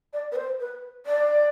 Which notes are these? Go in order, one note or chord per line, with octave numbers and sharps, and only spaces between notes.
D5
B4
C5
B4
D5